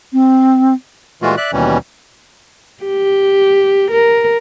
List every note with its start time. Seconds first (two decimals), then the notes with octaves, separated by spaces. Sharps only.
0.13 C4
1.22 A#2 E3 G#3 A3 F4 F#4
1.37 D5 E5 F#6
1.53 D#2 B2 E3 G3 C#4
2.84 G4
3.91 A#4